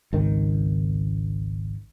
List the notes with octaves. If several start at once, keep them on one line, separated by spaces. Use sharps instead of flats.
G#1 C#2 D#3